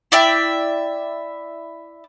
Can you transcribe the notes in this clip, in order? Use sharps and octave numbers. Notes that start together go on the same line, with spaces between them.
E4 D5 E5 G5